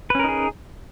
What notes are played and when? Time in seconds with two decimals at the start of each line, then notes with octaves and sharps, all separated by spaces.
0.10 B4
0.15 C#4
0.19 A#4
0.24 D#4
0.29 G#4